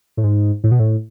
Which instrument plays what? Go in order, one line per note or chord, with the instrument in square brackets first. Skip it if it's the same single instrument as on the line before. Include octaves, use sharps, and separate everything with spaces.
[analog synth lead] A2
G#2
A2
B2
A2